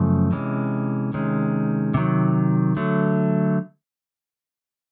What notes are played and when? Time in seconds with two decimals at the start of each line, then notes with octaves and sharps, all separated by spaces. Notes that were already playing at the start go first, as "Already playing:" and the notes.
Already playing: F#2 C#3 F3 A3
0.32 C3 E3 G#3 C#4
1.14 C3 D#3 G#3 C#4
1.94 C3 D#3 F#3
2.77 D3 F#3 A3